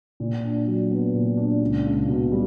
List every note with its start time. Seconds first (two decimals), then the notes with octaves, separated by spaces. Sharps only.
0.20 A#2
0.44 D4
0.67 F#3
0.91 B3
1.14 A#2
1.37 D4
1.61 C#2
1.85 C#2
2.08 B2
2.32 G3